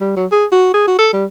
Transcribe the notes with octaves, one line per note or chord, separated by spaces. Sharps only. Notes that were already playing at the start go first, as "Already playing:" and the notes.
G3
F#3
G#4
F#4
G#4
F#4
A4
G3